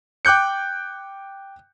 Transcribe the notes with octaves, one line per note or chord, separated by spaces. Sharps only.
G5 D6 F#6 G6 C#7